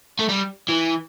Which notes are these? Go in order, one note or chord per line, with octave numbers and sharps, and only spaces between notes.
A3
G3
E3